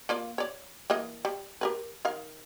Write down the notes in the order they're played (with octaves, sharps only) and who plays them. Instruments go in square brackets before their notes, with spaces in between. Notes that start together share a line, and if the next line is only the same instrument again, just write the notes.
[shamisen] A#3 F4 D5
C#5 D5
E3 A#3 D#5
G3
G4 A#4 B4
D#3 A#4 F5